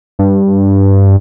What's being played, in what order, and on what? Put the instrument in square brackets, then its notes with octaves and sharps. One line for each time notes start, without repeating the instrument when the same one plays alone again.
[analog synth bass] G2